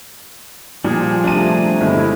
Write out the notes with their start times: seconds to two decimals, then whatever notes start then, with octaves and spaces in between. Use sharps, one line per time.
0.84 A#2 F3 G3 G#4
1.24 C3 A3 D4 A#5 D#7
1.81 G1 D3 G#3 E4